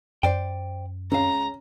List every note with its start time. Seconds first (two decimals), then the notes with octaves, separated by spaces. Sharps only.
0.23 F#2 C5 D5 G5
1.12 C#2 C#4 F5 A#5